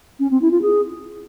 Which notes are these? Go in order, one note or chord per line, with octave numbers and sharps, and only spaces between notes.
C#4
C4
E4
F4
G#4